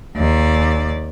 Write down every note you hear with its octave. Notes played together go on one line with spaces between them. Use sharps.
D#2 D5